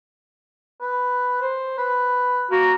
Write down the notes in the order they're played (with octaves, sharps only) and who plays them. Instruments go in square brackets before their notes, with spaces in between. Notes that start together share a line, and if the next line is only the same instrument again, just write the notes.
[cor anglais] B4
C5
B4
[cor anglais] A#3 [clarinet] F#4